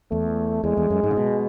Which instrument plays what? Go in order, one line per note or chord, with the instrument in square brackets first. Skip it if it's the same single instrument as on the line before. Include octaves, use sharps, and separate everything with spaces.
[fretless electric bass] E2 [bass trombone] A3
[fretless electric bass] E2 [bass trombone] G#3
[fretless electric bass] E2
F#2
G#2
C#3
B2